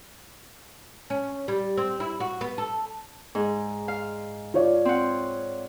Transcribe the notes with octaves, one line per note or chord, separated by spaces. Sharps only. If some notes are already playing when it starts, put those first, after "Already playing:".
C#4
G3
C4
E4
F#4
B3
A4
G#2
F5
F4 C#5 D5
C4 F#5